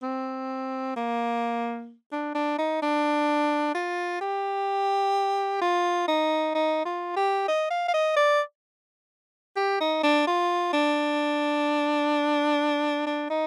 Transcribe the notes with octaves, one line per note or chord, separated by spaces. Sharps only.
C4
A#3
D4
D4
D#4
D4
F4
G4
F4
D#4
D#4
F4
G4
D#5
F5
F5
D#5
D5
G4
D#4
D4
F4
D4
D4
D#4